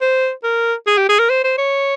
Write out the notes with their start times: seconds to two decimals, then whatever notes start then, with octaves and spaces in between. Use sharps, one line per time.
0.02 C5
0.44 A#4
0.87 G#4
0.97 G4
1.09 G#4
1.19 A#4
1.30 C5
1.44 C5
1.58 C#5